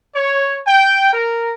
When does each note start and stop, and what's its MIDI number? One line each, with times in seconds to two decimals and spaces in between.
0.15 0.59 73
0.67 1.13 79
1.14 1.53 70